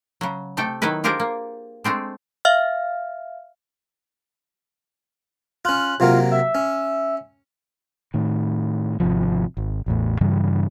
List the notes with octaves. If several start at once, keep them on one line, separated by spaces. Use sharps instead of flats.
C#3 F#3
C3 A3 A4 G5
D#3 F#3 B3 E4 B4
D4 F4 G4 G#4 A#4 C5
A#3
G#3 A3 C4 D4
E5 F5 F6
C#4 F4 F#6
C3 F#3 A#3 F4
E5
C#4
A2 D#3
G#1 C#2 C3 F3
G#1
A1 E2 A2
G2 C#3 E3 G3